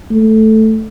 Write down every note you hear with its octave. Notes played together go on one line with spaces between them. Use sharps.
A3